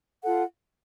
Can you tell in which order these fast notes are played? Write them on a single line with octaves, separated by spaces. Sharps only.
A4 F#5 F4